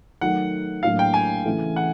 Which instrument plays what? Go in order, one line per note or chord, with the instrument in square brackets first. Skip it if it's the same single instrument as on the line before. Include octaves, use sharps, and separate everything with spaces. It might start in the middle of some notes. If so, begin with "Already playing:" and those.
[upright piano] D#3 F#3 A3 [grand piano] F#5
[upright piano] A2 F#3 A#3 D4 [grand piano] F5
[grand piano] G5
G#5
[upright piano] C#3 E3 A3
[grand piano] F#5